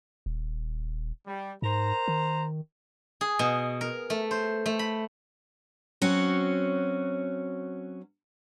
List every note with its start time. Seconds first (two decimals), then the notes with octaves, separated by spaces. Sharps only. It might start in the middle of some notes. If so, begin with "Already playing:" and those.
0.26 D#1
1.26 G3
1.62 G#2 A#4 C5 A#5
2.08 D#3
3.21 G#4
3.39 B2
3.81 A#4
4.10 A3
4.31 C5
4.66 A3
4.79 B5
6.02 F#3 C4 C#4 F#4